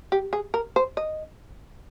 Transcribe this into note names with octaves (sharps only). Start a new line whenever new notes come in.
G4
G#4
A#4
C5
D#5